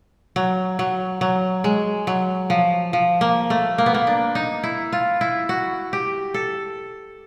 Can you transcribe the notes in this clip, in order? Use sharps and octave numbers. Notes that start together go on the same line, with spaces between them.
F#3
F#3
F#3
G#3
F#3
F3
F3
A#3
A3
A#3
B3
A#3
D4
D#4
E4
F4
E4
F#4
G4
A4